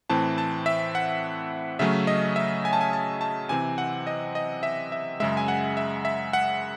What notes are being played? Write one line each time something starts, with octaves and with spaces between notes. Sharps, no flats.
A2 E3 C4 A5
A5
E5
F#5
C#3 F#3 A3 C#4 E5
D#5
E5
G#5
A5
G#5
A5
A5
C3 E3 C4 G#5
F#5
D#5
D#5
E5
E5
F#2 C#3 G#3 E5
G#5
F#5
E5
E5
F#5